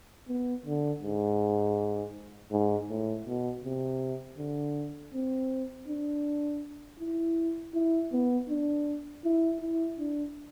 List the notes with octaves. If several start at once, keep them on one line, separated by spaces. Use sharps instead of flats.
B3
D3
G#2
G#2
A2
B2
C3
D3
C4
D4
E4
E4
B3
D4
E4
E4
D4